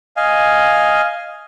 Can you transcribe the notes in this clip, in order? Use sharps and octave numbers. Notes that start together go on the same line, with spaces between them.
D#5 F5 G#5